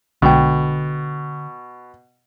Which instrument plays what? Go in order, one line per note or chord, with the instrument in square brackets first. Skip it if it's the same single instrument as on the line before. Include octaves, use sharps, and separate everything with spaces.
[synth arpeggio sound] B1 G#3 G5 [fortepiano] B2 [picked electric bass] D3